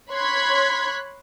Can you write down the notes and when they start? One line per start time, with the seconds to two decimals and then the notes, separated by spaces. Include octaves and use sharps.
0.10 C#5 B5 C6 F#6 G#6 B6